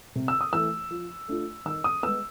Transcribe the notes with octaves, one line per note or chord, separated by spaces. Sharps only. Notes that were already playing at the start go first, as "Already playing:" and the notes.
C3
E6
D#6
E3 A3 E6
F3
A3 D4 F4
D#3 E6
D#6
G#3 B3 E6